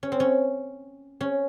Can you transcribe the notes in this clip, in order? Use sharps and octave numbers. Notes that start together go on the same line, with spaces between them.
C#4
C4
C#4
C#4